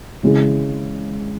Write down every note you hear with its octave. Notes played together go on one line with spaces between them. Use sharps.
C#3 G#3 E4 G#4